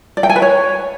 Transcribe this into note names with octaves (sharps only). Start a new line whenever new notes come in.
D5
G5
G#5
B4
C#5